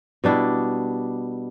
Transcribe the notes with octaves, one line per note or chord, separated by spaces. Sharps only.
B2 G3 D4 E4